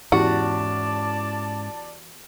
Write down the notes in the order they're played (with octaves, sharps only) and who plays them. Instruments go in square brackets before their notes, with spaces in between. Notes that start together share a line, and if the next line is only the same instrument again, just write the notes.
[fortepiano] E2 G4 [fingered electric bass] G#2 C#4 [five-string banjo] F#4 [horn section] D5 A5